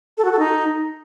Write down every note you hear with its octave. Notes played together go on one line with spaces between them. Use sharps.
A4
F#4
A4
D#4